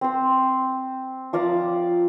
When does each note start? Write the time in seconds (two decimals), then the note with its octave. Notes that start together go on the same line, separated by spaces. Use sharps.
0.01 C4 C5
1.33 F3 D5 F5 A#5